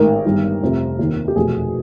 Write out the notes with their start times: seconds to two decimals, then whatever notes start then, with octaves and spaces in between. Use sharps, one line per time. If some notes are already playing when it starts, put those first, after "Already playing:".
Already playing: A1 G#2 D#3 A#4
0.25 G1 G2 D#3
0.62 F1 F2 C3
0.99 D#2 D#3
1.28 G4
1.36 F1 E2 B2 G#4